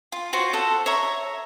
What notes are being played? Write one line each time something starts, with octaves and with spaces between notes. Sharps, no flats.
F4
F4 F#4 C5 C#5
A4 F#5
C#5 E5 A#5